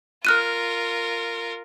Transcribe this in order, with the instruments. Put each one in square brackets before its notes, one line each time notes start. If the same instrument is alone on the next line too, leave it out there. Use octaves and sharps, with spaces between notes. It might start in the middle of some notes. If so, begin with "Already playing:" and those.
[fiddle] F4 A#4 [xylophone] F6 F#6 D#7